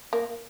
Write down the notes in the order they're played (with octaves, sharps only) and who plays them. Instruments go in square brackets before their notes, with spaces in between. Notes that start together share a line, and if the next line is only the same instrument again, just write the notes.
[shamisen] A#3